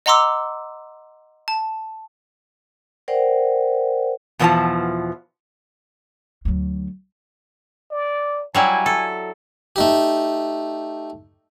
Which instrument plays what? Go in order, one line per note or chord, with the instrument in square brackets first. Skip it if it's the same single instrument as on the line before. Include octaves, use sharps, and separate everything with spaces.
[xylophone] D#5 F#5 A#5 C6 D6 E6
A5
[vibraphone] A#4 C5 D5 F#5 G5
[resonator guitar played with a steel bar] E2 B2 E3 F3 F4 A5
[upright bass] D2 F#3
[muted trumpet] D5
[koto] F#3 G3 E4 [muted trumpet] G#5
[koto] A4
[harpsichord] A3 D#4 G4